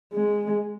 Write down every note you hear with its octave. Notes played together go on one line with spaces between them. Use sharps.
G#3